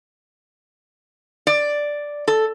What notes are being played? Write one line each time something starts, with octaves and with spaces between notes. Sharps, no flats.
D5
A4